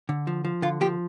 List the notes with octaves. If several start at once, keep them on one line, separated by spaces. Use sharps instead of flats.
D3
F3
F3
D3 F4
F3 G4